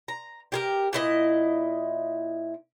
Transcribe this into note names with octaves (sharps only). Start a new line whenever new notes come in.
A#5
G4 G#4 A#4
A#2 E4 D#5